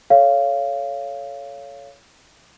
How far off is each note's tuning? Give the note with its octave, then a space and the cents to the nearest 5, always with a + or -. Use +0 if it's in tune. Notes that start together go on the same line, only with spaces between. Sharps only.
A4 +0 C#5 +15 F5 -15